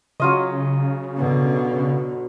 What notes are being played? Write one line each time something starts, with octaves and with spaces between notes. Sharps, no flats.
C#3 F#3 F4 D#5
B2 D3